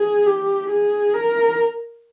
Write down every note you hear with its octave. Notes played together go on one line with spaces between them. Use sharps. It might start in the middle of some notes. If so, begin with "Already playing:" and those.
Already playing: G#4
G4
G#4
A#4